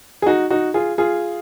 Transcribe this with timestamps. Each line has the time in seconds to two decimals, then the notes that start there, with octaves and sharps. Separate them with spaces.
0.22 G#4
0.26 D#4 F#4
0.50 D#4 F#4
0.74 F4 G#4
0.98 F4 G#4